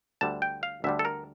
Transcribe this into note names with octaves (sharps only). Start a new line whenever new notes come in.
D2 D3 G3 A5
G5
F5
D2 D3 G3 E5
A4
A#4